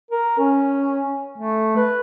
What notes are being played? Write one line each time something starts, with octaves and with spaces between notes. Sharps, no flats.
A#4
C#4
A3
B4